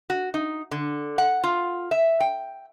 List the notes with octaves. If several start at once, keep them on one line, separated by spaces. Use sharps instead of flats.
F#4
D#4
D3
F#5
F4
E5
G5